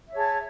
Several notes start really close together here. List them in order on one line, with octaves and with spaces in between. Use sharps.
E5 C#5 G#4 A5